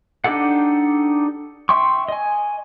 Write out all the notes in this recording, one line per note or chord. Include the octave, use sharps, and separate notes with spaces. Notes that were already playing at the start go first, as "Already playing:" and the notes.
D4 D#4 G4 A4 F#5
E5 G5 C6 C#6
D#5 G#5